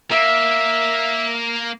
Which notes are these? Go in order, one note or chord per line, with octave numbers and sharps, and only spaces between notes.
A#3 E5